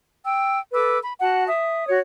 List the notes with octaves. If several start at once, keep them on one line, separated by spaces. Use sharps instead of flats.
G5 E6
A4 B4 D6 E6
B5
F#4 F#5 A5
E5 D#6
F#4 C#5